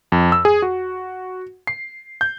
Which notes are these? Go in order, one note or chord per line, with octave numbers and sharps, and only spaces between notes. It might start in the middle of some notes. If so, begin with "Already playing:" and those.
F2
E6
G#4
F#4
C7
G6